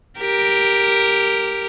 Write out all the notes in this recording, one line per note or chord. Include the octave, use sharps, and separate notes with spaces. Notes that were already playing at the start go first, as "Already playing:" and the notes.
G4 A#4